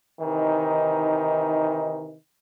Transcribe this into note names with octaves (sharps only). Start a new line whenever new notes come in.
C3 D#3 E3 D#4